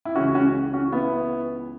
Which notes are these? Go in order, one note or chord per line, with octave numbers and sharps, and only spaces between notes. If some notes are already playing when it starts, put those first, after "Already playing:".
E4
C#2 C#3 E3 C#4 F#4
C#4 F#4
C#4 F#4
B3 E4